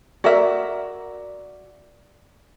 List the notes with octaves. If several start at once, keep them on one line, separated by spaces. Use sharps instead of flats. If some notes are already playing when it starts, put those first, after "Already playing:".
F#4 A#4 D5 E5